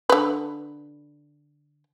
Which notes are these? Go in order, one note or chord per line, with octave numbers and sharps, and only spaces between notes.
D3 B4